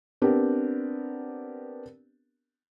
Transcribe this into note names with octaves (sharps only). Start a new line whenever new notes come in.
B3 C4 D4 G4 A#4